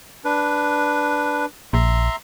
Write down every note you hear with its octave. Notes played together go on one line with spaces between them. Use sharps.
D4 B4
A#1 E5 A#5 C6